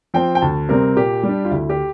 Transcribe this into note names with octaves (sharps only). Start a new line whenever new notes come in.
F3 C4 G5
G5
D2 A5
C3 G3 C4 A#4
A#2 G4
G3
D4
F4
D2 E4
G4